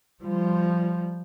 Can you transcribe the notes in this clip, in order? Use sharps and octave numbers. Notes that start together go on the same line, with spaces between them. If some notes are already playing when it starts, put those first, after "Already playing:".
F3 G3